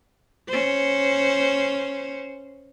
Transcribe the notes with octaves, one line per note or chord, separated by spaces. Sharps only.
C#4 C5